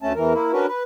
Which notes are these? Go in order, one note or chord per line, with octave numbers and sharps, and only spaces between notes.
D2 A3 C#4 A5
E2 E3 A#4
A#3 E4
C#4 D4 F#4 A#4 B4
B4